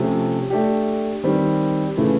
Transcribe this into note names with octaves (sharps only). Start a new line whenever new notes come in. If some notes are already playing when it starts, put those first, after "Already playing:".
Already playing: C3 F3 A3 C#4
A3 D4 G4
D#3 G3 C4
C#3 E3 A3